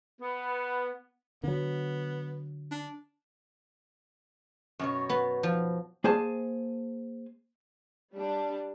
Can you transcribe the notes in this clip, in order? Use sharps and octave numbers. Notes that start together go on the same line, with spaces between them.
B3
D3 F#3 B3
D4
F#2 B2 C#5
B3
F3
A#3 G#4 C5 G#5 A5
G3 D4